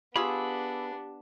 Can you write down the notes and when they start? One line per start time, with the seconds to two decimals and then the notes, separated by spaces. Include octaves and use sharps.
0.16 B3 D4 F4 G4 G#4 B5 E6